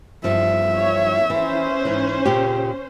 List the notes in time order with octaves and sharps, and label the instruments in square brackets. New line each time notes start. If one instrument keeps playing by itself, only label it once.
[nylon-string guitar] G2 F3 [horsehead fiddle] E5
[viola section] C#5
[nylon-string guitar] E3 [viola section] C#4 C5
[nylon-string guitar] G#2 E3
A#2 C#3 G4